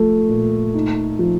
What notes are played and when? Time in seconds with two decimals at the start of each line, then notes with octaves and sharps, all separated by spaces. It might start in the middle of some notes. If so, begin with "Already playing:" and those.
Already playing: F3 A3
0.29 A#2
0.74 D#4
1.19 F3